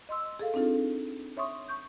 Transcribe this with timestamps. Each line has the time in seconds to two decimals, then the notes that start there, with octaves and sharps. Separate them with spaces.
0.09 D#5 C6 E6
0.39 G#4 A4 F5
0.54 C4 D4 D#4 F4 A4
1.37 C#5 E5 C6 C#6 D#6
1.68 C#6 G6